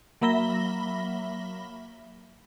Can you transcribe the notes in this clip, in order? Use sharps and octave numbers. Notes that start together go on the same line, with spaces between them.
F#3 A#3 E5 B5 A#6 G7